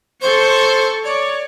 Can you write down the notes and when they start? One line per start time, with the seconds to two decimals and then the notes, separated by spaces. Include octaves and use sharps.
0.21 A4 C5 C#6
1.04 C#5 D5